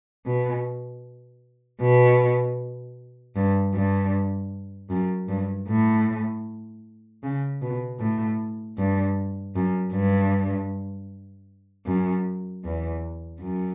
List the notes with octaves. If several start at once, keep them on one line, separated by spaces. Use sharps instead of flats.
B2
B2
G2
G2
F#2
G2
A2
C#3
B2
A2
G2
F#2
G2
F#2
E2
F#2